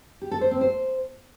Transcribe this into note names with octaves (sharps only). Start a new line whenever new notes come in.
G4
A4
C5
C4
C5